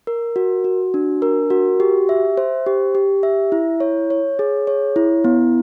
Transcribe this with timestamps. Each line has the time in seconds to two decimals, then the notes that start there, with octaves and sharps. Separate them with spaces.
0.07 A#4
0.36 F#4
0.64 F#4
0.94 D4
1.22 A#4
1.50 F#4
1.80 G4
2.09 E5
2.37 C5
2.66 G4
2.95 G4
3.23 E5
3.52 E4
3.80 C#5
4.10 C#5
4.39 G#4
4.67 C#5
4.96 E4
5.24 B3